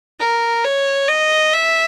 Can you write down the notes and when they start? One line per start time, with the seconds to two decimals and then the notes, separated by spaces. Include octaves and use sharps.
0.20 A#4
0.65 C#5
1.09 D#5
1.54 E5